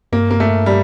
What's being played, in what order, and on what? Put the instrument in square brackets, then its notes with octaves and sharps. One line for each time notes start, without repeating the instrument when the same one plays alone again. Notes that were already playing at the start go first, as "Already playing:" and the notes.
[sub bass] G2 [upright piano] A#3
[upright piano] A#3
A3
G3